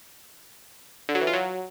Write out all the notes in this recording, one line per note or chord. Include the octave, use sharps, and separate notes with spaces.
D3
F#3
E3
F4
F#3